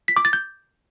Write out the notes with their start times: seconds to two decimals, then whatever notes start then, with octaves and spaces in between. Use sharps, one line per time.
0.08 B6
0.17 D6
0.25 A6
0.33 G6